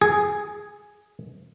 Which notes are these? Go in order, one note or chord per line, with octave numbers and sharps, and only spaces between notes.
G#4